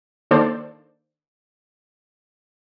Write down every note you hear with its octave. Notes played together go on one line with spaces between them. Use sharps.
D#3 A#3 D4 A4 C5 D5